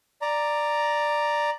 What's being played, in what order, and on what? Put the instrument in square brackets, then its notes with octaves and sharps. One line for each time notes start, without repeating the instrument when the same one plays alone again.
[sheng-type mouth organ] D5 A#5